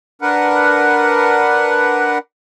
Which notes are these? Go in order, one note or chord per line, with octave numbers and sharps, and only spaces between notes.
D4 A#4 B4 F#5